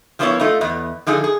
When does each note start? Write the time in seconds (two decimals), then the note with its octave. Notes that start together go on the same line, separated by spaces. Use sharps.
0.19 F3 A#3 B3 D#4 E4 C#5
0.40 A3 D#4 F4
0.61 E2 B3 D#5
1.07 D3 F3 D#4 G#4
1.24 G#4